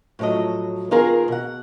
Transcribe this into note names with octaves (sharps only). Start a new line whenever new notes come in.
A2 F3 F#3 A4 D#5
D#3 B3 F4 G#4 A#4 A#5
B2 F#5